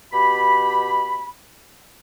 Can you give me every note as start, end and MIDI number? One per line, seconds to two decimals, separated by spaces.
0.13 1.30 47
0.13 1.30 67
0.13 1.30 83